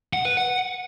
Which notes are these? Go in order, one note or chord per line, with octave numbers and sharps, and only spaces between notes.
F#5
B4
F#5